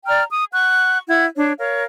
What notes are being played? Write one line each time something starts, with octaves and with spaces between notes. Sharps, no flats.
D5 G5 A#5 F6
D#6
F#5 C#6 F#6
E4 F#5 G#6
D4 C#5
A#4 C#5 F5